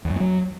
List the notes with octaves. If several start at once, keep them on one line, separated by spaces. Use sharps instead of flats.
E2
F#2
A#3
F#3